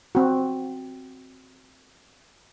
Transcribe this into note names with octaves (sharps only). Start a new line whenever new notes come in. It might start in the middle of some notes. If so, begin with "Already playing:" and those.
C4 F#4